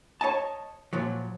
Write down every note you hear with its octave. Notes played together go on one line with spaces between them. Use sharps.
C#5 D#5 A5
A#2 F3 F#3